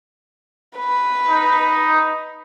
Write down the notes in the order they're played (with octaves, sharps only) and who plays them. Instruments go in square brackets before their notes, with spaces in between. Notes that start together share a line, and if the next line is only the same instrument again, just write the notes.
[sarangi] B4
[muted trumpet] D#4